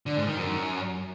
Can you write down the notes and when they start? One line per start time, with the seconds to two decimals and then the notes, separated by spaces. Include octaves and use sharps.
0.06 D3
0.16 G#2
0.27 D#3
0.37 F#2